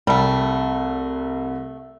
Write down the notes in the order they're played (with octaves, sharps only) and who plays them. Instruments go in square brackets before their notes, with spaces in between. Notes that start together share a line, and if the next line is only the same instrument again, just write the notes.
[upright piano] C2 [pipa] G3 A3